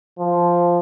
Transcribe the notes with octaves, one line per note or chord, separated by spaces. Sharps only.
F3